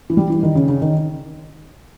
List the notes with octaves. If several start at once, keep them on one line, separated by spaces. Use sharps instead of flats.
E3
G3
E3
D#3
C#3
C#3
D#3